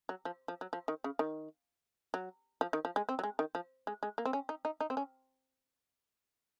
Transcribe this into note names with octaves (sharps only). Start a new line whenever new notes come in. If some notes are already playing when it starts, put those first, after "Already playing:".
F#3
F3
F3
F#3
F3
D#3
C#3
D#3
F#3
F3
D#3
F3
G#3
C4
F#3
G#3
D#3
F3
G#3
G#3
A#3
C4
C#4
D#4
D#4
D#4
C4
C#4